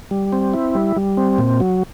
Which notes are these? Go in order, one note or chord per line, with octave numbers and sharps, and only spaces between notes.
G3
C4
E4
G3
G3
C4
A#2
F#3